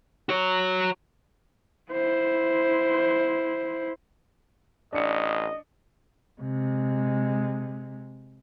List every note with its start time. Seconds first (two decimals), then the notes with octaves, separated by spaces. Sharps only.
0.29 F#4 C#5
1.91 E4 C5
4.93 A1 D4 D#5 C#7
6.41 C3 G#3